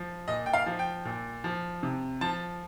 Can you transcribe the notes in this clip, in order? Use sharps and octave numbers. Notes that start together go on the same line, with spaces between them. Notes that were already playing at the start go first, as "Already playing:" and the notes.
Already playing: F3
A#2 D#5
G5
F5
F3
G5
A#2
F3
C3
F3 A5